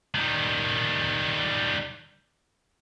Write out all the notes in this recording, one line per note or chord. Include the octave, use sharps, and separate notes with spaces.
D#3 G3